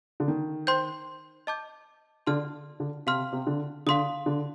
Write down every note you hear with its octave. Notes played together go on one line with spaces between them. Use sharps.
D3
D#3
C5 G5 C6 G6
D#5 A5 D6 G6
D3 D5 A5 C6 F6
D3
C3 F5 C6 F6
C3
D3
D3 F5 C6 D#6
D3